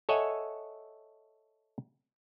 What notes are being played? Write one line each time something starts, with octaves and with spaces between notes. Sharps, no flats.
A4 C#5 D#5 E5 F#5 G#5